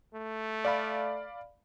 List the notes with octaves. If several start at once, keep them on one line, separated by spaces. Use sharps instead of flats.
A3
D5 F5 B5